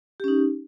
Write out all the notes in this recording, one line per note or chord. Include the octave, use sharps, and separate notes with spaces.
C#4 D#4 G4